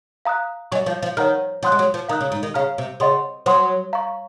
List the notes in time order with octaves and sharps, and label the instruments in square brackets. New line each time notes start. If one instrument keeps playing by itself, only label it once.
[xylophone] F5 A#5 D#6 F#6
[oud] F#3 [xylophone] D#5 G#5 C#6
[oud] F3
F3
[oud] D#3 [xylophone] C#5 F#5 A#5 F6
[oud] F3 [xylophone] C#5 F#5 C6 D#6 F#6
[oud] G#3
F#3
F3
[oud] D#3 [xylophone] F5 A#5 D#6 F#6
[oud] C#3
G#2
D#3
[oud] C#3 [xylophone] F5 A#5 F6
[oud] C3
[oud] C#3 [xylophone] D#5 F#5 C6
[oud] F#3 [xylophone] C5 F#5 C6 D#6
[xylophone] F5 A#5 C#6